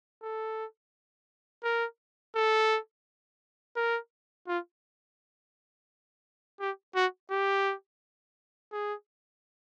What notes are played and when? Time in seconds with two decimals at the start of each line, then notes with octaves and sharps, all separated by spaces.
0.23 A4
1.64 A#4
2.35 A4
3.76 A#4
4.48 F4
6.60 G4
6.95 F#4
7.31 G4
8.72 G#4